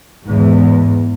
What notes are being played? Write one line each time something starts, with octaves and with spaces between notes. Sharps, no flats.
E2 G#2